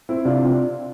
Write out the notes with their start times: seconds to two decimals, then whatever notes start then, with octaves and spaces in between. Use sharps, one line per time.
0.09 C4 E4
0.25 C3 D4 F4